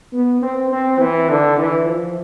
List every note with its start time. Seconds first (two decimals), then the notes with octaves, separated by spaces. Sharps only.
0.13 B3
0.42 C4
0.71 C4
1.00 E3
1.29 D3
1.58 E3
1.87 F3